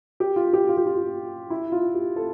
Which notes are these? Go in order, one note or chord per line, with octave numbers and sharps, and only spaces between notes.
G4
F4
G4
F4
G4
F4
E4
F4
G4
A4